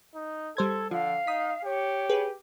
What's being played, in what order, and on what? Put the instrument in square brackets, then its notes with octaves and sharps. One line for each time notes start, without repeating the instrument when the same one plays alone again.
[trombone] D#4
[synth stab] G3 C5 G#6 [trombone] A4
[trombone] D3 [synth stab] F3 [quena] F5
[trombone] D#4 [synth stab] D#6 B6
[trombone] G4 [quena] C#5
[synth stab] G#4 B4